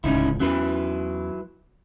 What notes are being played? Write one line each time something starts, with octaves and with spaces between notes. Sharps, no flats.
D1 G1 C#2 C#4 D#4 E4
E2 F#3 C#4 E4 B4